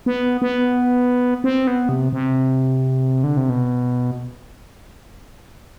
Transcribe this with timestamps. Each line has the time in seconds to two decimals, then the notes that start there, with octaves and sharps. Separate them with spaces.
0.06 B3
0.42 B3
1.44 C4
1.67 B3
1.89 C3
2.12 C3
3.24 D3
3.37 C3
3.49 B2